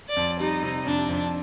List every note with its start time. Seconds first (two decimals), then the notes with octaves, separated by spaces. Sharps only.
0.09 D5
0.17 F2
0.40 G3 D#4
0.63 C3
0.86 F2 D4
1.09 F2